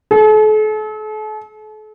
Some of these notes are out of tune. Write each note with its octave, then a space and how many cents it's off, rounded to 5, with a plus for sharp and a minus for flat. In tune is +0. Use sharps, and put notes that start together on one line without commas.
A4 -40